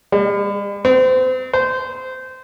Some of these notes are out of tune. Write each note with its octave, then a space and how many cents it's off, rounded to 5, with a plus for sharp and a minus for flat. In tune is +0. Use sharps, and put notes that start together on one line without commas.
G3 +45
C4 -35
C5 -20